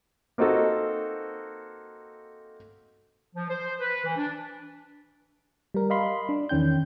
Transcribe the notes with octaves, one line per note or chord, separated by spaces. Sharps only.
A#3 C4 D#4 F#4 A4
F3
C5
B4
E3
D4
G3 A#4
D#5 F5 B5 C6
D4
E2 D#3 C#4 G5 G6